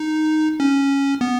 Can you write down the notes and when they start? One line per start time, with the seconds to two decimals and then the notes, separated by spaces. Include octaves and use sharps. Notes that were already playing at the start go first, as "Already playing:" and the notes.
Already playing: D#4
0.60 C#4
1.21 B3